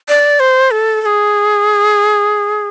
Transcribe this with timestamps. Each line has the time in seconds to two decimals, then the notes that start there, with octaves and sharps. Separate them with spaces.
0.08 D5
0.40 C5
0.71 A4
1.02 A4
1.06 G#4